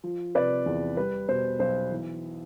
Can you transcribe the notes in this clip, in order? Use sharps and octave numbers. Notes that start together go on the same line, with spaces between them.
F3
C3 B4 D5
E2
G3 B4
B2 C5
B1 C5
E3